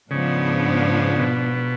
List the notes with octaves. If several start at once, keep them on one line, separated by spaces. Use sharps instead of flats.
G#2 C#3 F3 B3 D4
B2